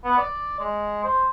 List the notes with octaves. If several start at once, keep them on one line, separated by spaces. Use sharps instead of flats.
B3
D5
G#3
C5